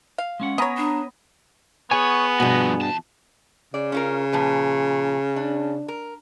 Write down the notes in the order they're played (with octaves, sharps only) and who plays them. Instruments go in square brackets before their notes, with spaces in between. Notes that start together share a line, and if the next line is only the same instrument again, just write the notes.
[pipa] F5
[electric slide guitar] G#3 C#4 F#5
[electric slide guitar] B3 [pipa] C#4 C#5 [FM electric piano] A#5 B5 D#6
[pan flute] D4
[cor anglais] B3 [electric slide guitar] G#4 F#5 G#5 [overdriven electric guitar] C#5
[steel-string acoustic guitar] G2 B2 [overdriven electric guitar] F3 F#4
[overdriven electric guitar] E2 A5
[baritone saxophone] C#3 [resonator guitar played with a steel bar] D5
[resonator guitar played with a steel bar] C#4 F4 A#4
A#2 F3 B4
D4
A#4